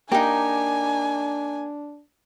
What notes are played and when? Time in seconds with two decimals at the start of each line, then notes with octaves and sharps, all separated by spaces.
0.12 A#3 D4 D#4 G4 G#5